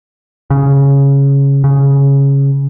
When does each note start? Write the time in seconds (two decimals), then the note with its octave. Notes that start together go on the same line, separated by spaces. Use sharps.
0.50 C#3
1.64 C#3